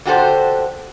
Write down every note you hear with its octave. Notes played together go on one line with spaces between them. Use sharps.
D3 F#4 G4 A4 C5